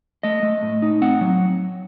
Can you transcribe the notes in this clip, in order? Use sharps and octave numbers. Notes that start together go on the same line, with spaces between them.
A3 D#5
A3
A2
D#4
C4 F#5
F#3